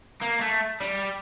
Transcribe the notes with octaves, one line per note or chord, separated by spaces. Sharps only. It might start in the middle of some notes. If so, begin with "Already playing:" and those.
A#3
A3
G3